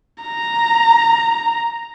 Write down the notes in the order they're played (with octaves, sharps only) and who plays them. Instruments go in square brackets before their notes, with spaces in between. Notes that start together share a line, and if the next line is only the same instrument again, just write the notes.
[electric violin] A#5